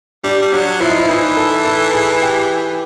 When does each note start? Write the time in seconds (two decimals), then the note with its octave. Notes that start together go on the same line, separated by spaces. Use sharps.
0.24 G3 D4
0.42 G3
0.53 F#3 D4
0.81 F3 E4
0.90 D#4
0.98 E4
1.08 E3 D#4
1.37 A4
1.65 A4
1.93 G#4
2.22 G4